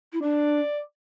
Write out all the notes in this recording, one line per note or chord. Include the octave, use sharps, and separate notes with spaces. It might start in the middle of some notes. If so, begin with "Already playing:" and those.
E4
D4 D5